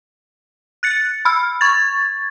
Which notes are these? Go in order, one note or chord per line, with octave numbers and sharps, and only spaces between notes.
F#6 A6 C#7
B5 E6 F6
C#6 G#6 A6